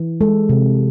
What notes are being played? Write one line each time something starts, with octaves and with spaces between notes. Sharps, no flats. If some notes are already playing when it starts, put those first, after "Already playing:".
Already playing: E3
G#3 A4
C3